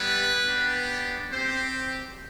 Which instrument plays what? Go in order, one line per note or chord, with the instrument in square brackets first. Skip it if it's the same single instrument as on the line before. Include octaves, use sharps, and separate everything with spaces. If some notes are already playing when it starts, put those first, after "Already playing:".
Already playing: [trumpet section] G3 B3 E4 B4
B3 D4 G4
C4 G4 C5